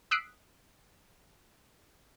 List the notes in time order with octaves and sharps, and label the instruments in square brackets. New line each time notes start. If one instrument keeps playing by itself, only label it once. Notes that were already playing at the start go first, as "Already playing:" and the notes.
[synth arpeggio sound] D#6 E6 F#6 B6 C7 D7